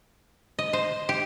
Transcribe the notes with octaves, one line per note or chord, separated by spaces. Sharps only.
D#5
C5
G4